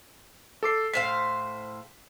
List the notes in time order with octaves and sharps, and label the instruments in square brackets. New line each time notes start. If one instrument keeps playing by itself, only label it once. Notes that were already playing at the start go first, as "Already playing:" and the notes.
[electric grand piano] A4 D6 C7
[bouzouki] A2 C5 F5 [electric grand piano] B6